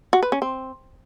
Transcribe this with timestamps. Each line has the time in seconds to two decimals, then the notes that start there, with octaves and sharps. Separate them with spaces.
0.13 F#4
0.23 B4
0.32 C#4
0.42 C4